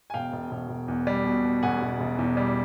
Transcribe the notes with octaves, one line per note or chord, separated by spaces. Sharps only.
G#5
E1 F5 G5
E1
E1
E1
E2
G3
B2
B2
E1 F#5 G#5
E1
E1
E2
G3